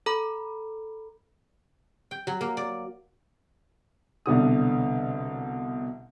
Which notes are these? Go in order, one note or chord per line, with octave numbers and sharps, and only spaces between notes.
A4 A#5 B5
G5
F#3
A#3
D5
C2 B2 D3 D#6